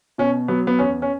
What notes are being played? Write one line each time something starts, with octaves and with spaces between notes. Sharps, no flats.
B2 C#4
F#3 B3
B3
E2 C#4
C#4